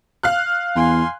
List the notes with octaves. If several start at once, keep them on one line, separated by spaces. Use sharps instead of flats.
F5 F6 F#6
E2 G#5 C6